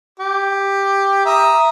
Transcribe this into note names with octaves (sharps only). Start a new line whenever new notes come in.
G4
E5 A#5 D#6